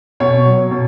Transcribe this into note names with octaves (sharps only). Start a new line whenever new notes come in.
B2 C#5
F#3
B2